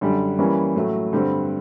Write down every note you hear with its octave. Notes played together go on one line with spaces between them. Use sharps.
F#2 D3 G3
E3 G3 A#3 C#4
A2 F#3 A3
G2 D3 G3 C4